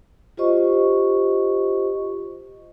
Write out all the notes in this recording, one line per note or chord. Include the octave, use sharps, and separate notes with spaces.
F4 G4 C5 D#5 C#6